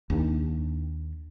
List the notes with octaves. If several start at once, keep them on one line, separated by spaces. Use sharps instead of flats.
D#2 D4